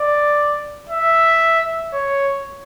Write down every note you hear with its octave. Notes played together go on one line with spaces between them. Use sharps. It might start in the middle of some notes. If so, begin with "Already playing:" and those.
Already playing: D5
E5
C#5